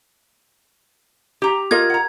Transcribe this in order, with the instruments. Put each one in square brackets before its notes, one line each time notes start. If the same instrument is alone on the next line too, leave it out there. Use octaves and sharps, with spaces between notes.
[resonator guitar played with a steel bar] G4 A#5
[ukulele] F4 A#4 D#5 [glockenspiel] G#6
[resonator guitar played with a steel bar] F#5 A#5